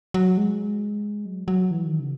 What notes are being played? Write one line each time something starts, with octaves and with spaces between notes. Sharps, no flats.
F#3
G#3
F#3
F#3
E3
D#3
C#3